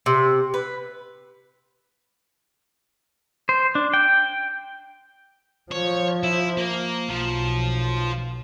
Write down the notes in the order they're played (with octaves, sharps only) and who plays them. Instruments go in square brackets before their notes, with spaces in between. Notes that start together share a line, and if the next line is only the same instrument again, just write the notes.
[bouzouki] C3
B4
[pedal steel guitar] C5
D4
G5
[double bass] F3 [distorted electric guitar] C#5
[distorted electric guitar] E4
A#3
[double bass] B1 [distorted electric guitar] F3